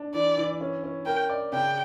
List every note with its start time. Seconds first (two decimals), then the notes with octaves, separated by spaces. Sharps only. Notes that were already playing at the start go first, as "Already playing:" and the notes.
Already playing: D4
0.14 E3 D5
0.38 E3
0.61 C#4
0.84 C#4
1.06 A#4 G5
1.30 D5
1.53 C#3 G5